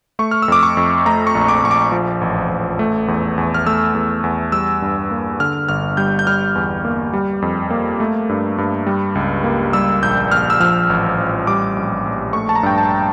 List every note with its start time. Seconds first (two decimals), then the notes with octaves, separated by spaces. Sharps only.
0.19 A3 C#6
0.31 F6
0.42 E6
0.48 F2 D6
0.63 C#6
0.77 F2
1.06 A3 A#5
1.27 C#6
1.35 A#1
1.48 D6
1.63 A#1 C#6
1.71 D6
1.92 F3
2.21 A1
2.50 A1
2.79 A3
3.08 E2
3.38 E2
3.54 F6
3.67 A3 E6
3.95 E2
4.24 E2
4.52 G3 E6
4.82 G2
5.11 A#3
5.39 D3 F6
5.68 G1 F6
5.97 G3 G6
6.19 G6
6.27 G3 F6
6.55 E2
6.85 A#3
7.13 G3
7.42 F2
7.70 A#3
8.00 A3
8.29 G2
8.58 G2
8.87 G3
9.15 C#2
9.44 A#3
9.73 G3 E6
10.02 A#1 G6
10.31 A#1 F6
10.50 E6
10.60 F3 F6
10.90 A1
11.18 A1
11.47 G3 D6
11.76 A#1
12.05 A#1
12.33 A3 C#6
12.49 A5
12.55 A#5
12.63 G2 G5
12.78 A5